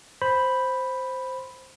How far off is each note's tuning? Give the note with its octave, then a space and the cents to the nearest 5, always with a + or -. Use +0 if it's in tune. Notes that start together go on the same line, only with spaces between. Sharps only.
C5 +0 B5 +0